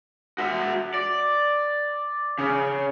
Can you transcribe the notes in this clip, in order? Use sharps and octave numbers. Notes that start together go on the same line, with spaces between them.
F#4 E5
D5
C#3